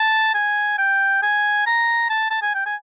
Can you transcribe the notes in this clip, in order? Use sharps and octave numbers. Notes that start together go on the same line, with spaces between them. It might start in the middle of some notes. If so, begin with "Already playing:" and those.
Already playing: A5
G#5
G5
G#5
A#5
A5
A5
G#5
G5
G#5